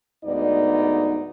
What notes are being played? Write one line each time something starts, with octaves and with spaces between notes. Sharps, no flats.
D2 G#2 B3 D#4 D5